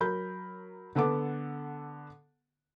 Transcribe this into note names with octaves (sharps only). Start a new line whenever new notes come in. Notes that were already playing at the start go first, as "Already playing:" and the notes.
F#3 A#4 B5 G6
D3 B3 A4 F#5 D6